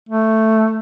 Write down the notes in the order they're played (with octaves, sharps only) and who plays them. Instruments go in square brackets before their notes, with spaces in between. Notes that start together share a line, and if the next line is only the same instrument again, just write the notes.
[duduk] A3